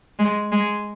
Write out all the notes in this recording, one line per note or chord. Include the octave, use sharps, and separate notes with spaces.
G#3
G#3